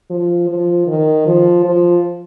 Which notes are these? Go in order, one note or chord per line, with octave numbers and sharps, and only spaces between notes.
F3
F3
D#3
F3
F3